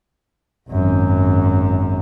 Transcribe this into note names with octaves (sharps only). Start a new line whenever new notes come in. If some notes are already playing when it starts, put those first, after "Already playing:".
G#1 F#2